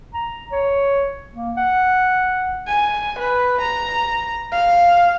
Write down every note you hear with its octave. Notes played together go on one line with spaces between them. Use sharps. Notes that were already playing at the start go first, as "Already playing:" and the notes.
A#5
C#5
A#3
F#5
G#5
B4
A#5
F5